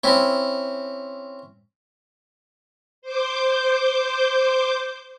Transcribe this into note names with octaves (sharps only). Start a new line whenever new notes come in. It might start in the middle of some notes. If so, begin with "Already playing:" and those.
C4 C#4 E4
C5 D6 G6